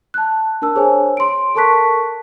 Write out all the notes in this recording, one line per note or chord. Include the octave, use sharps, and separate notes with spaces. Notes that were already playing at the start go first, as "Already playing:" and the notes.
A5 F#6
D4 A#4 A5 E6
G#4 C5 C#5 G#5
C6 D7
A4 A#4 A5 C#6 F#6 B6